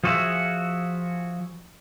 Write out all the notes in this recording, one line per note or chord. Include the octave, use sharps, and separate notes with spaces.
F3 F4 F#4 G#4 E5